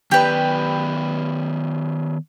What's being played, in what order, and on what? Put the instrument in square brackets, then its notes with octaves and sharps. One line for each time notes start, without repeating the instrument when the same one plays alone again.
[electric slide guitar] D#3 B3 D5 [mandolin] G4 B4